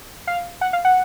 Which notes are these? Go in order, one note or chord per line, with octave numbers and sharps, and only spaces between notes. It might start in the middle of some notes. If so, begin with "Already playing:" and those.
F5
F#5
F5
F#5